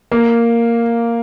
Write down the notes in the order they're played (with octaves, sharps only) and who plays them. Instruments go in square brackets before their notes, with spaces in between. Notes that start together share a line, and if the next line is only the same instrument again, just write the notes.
[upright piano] A#3